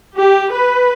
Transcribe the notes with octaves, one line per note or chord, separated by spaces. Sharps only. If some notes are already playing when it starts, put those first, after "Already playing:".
G4
B4